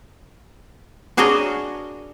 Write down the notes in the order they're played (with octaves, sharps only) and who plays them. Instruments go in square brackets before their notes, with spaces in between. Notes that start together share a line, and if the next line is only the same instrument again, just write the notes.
[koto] D4 F#4 G#4 A#4 C#5 D#5